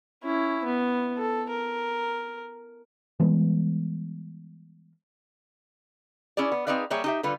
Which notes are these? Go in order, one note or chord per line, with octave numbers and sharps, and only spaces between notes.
C#4 E4
B3
A4
A#4
E3 G3 G#3 B3
C#4 E4 G#4 D5
B3
C4 D#4 G#4 B4 D5 F5
G3 A#3 G4 G#4 C#5 E5
D#4 G4 E5
D3 G3 F4 B4